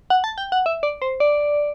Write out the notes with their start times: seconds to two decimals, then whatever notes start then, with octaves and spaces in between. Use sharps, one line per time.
0.10 F#5
0.24 A5
0.38 G5
0.52 F#5
0.66 E5
0.83 D5
1.02 C5
1.20 D5